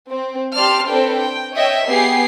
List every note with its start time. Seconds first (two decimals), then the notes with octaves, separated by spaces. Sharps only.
0.11 C4
0.55 G4 D5 A5 C6 F6
0.89 C4 D4 A4 B4 G5
1.19 G5
1.52 C#5 D#5 E5 G5
1.88 B3 G4 G#4 C7